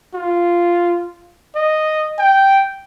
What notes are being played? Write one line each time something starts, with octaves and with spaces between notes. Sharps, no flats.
F4
D#5
G5